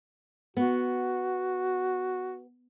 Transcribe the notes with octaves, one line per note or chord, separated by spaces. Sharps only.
B3 F#4